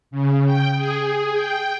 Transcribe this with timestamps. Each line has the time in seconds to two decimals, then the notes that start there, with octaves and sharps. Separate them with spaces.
0.11 C#3
0.46 G5
0.76 G#4
1.33 G5